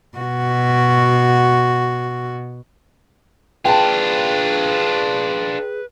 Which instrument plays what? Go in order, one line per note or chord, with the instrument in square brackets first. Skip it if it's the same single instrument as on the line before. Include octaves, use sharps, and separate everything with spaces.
[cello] B2 F#4
[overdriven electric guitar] D4 F4 [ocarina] G#4 [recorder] B4 [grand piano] G5 A5